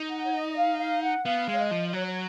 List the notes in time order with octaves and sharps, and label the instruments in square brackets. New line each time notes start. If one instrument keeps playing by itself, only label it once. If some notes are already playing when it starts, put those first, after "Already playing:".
Already playing: [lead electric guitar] D#4
[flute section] F#5
C#5
D#5
D#5
F5
F5
F#5
[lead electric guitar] B3 [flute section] F5
[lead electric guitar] G#3
[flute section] C#5
D#5
[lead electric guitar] F3
[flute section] D#5
[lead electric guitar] F#3 [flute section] C#5
[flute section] C#5